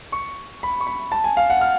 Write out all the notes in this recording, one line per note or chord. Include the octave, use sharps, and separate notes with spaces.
C#6
B5
C#6
B5
A5
G#5
F5
F#5
F6